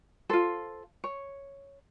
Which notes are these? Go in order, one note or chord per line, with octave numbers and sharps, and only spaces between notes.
F4 A4 C5
C#5